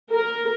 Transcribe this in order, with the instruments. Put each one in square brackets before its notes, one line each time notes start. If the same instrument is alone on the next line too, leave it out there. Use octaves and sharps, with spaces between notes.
[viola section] A#4